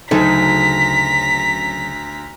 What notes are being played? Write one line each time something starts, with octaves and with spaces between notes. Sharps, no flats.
D2 C#3 F#3 D#4 A4 A#5 B6